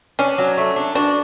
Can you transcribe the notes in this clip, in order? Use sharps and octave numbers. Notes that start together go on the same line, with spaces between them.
C#4 D4
F#3
A3
D4
D4 F#4